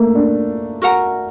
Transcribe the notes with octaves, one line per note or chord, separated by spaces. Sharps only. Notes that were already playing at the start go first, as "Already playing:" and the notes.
Already playing: A3 A#3
D4
F#4 A#4 F#5 A#5